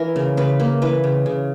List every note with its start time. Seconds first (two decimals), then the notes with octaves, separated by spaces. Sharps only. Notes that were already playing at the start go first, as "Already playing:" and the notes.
Already playing: E3 A#4
0.16 C#3
0.37 C#3 B4
0.60 A#3
0.82 E3 B4
1.04 C#3
1.26 C#3